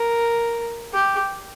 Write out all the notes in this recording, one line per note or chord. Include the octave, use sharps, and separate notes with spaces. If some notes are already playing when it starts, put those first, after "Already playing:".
Already playing: A#4
G4